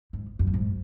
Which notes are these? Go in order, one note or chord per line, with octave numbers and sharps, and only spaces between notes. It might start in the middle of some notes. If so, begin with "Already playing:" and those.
G#2
F#2
A2
G#2